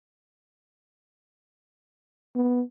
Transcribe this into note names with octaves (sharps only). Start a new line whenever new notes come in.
B3